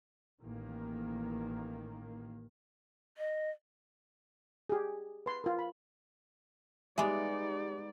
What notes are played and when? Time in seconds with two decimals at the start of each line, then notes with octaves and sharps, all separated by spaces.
0.43 A1 D#3 A#3
3.18 D#5
4.69 G4 G#4
5.26 B4 C6
5.44 F4 A#4
5.59 B5
6.98 G3 G#3 B3 D#4 D5 E5 G#5 D6